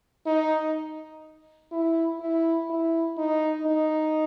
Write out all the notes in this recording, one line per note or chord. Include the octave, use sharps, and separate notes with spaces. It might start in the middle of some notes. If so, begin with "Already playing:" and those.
D#4
E4
E4
E4
D#4
D#4